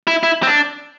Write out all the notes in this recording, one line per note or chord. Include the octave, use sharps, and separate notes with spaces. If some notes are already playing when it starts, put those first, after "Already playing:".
E4
E4
C4
D4